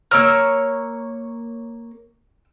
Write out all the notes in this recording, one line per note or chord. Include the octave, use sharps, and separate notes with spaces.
A#3 C#5 A#5 E6 F6